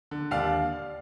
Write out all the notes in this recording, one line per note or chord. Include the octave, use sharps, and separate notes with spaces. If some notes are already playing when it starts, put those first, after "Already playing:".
D3
D#2 D5 F5